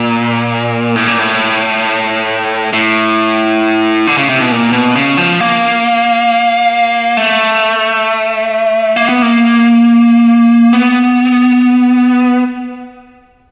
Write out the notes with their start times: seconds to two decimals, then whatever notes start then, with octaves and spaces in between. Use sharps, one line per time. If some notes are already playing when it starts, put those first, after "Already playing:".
Already playing: A#2
0.96 A2
1.07 A#2
1.19 A2
2.73 A2
4.07 D3
4.17 C#3
4.29 C3
4.40 B2
4.51 A#2
4.73 B2
4.95 C#3
5.17 F3
5.40 A#3
7.17 A3
8.96 A#3
9.09 B3
9.22 A#3
10.73 B3